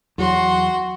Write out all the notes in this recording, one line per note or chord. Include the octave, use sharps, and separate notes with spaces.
E2 F#3 F#4 C6